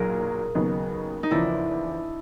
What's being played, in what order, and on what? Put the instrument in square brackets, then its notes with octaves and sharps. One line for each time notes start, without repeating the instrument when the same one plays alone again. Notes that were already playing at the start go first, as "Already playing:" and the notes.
Already playing: [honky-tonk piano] B1 A#2 F#3 [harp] G#4 A#4
[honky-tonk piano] D#2 C#3 F#3 B3 D#4
[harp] D#4
[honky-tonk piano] E2 C#3 F3 [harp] D4 E4